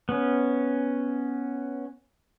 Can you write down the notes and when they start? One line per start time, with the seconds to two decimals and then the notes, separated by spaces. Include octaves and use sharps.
0.09 B3 C#4